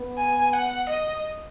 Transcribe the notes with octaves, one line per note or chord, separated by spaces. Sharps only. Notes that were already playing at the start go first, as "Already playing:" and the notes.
Already playing: B3
G#5
F#5
D#5